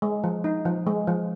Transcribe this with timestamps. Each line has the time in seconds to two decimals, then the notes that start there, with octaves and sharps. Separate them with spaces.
0.02 G#3
0.24 F3
0.44 D#4
0.65 F3
0.87 G#3
1.07 F3